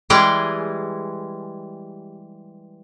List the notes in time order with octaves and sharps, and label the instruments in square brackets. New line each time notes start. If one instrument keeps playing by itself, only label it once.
[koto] E3 G3 G#3 G4 G#4 G5